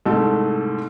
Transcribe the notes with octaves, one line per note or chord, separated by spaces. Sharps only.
C2 G#2 A3 A4